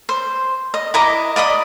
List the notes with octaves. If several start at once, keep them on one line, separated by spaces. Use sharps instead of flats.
C5
D#5
E4 D#5 A#5 D6
D5 D#5 B5 D#6